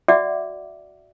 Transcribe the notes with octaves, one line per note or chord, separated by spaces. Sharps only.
F#4 D5 E5 F#5 D6